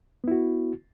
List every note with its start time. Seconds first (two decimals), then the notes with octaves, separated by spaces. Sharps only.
0.24 B3
0.28 E4
0.31 F#4